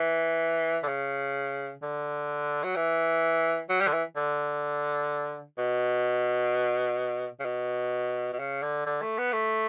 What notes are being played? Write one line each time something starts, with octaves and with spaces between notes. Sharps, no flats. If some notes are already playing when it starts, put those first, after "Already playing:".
Already playing: E3
D3
C#3
D3
F#3
E3
F#3
G3
D3
E3
D3
B2
C#3
B2
B2
C#3
D3
D3
A3
B3
A3